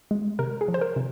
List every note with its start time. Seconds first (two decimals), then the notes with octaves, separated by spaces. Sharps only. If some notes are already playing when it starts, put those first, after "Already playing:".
0.11 G#3
0.39 C3 A#4
0.61 G#4
0.68 F3
0.74 C5
0.81 A#4
0.96 C3